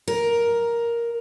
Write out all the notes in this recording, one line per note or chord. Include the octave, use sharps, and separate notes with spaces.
A#4